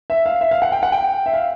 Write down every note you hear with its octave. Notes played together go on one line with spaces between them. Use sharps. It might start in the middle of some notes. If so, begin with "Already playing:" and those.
E5
F5
E5
F5
F#5
G5
F#5
G5
E5
F5